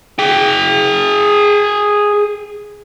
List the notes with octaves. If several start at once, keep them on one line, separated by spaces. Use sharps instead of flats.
G#4 G5